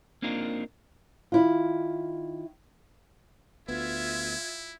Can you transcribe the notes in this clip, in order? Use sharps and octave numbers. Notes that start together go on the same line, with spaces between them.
A#3 C4 D4 D#4 F4 A#4
D#3 E4 F4
D2 B3 E4 F4 E5 G#6